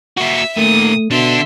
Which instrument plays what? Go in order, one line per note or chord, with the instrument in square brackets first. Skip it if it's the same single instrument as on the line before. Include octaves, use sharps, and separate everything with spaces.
[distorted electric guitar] A#3 F#4 [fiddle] E5 E6
[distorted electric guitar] A#2 D#3 [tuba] A3 [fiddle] D#6
[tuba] B2 [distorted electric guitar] D3 D4 [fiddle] E5 C6